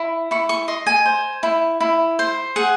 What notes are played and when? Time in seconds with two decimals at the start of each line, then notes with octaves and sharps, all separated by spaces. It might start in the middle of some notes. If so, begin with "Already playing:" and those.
Already playing: E4
0.31 E4 C#6
0.49 C#6
0.68 D#5 C6
0.86 G#5
1.06 C5
1.43 E4
1.81 E4
2.19 C5
2.56 G#4 F#5